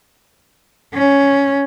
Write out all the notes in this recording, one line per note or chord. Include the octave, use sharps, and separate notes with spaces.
C#4